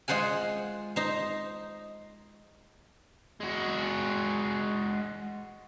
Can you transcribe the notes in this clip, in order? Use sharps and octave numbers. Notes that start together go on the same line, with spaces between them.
G#3 F4 C5 F#5 G#5
D#4 C5
G#3 F#4